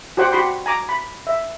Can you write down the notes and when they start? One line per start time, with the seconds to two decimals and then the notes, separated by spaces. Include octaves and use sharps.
0.17 F#4 G4 C5 F#5 G5
0.32 F#4 G4 B5 C6
0.66 G#5 A#5 D6
0.89 B5
1.27 E5